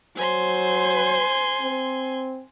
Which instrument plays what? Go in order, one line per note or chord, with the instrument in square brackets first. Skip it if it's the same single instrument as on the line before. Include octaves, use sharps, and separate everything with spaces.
[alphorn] F#3 [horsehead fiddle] C5 [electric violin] G#5 C6
[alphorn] C4